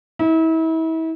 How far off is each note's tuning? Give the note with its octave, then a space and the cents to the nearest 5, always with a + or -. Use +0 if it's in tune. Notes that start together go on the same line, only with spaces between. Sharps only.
E4 -35